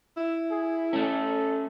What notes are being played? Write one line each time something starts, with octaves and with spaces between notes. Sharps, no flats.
E4
G#4
A3 C#4 A4